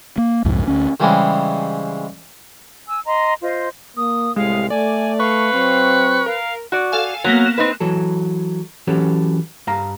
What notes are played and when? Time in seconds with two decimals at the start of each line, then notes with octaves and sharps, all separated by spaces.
0.18 A#3
0.45 C2 F2 G#2 F3
0.68 D2 C#4
1.00 C#3 E3 G3 G#3 C4 C#4
2.88 G#5 E6
3.06 D#5 A#5 C6
3.42 F4 C5 D#5
3.97 A#3 D#6
4.36 C2 A2 G#3 G4 F5
4.70 A3 D5 G#5
5.20 B4 F5 C#6
5.53 F#3 C4
6.26 A#4 F5
6.72 F#4 D5
6.92 A4 F5 G#5
7.24 F#3 A#3 B3 A#4
7.45 F#6 E7
7.58 C4 D#4 B4
7.80 E3 F#3 A4
8.87 E3 F#3 C#4 G4 A4
9.67 G2 F5 A#5